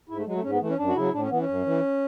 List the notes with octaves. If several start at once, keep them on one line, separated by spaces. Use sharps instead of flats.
G#2 E4
A3
F#3 G#3
A3
G#2 C#4
B3
E3 A3
C#4
F#2 D4
F#4
C#3 F#3 E4
A2 D4
C#4
E3 B3
C#4
F#2
E3